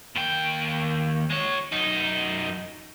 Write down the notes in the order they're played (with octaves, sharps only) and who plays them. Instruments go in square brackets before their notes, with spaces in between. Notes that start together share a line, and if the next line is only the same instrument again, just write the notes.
[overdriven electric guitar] D#2 G5
G#3 C#5
F#2 D#4